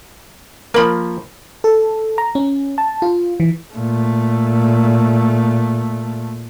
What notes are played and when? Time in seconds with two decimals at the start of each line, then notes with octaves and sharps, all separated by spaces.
0.74 F3 A#3 A#4 B5
1.64 A4
2.18 A#5
2.35 C#4
2.78 A5
3.02 F4
3.40 E3
3.74 A#2 A3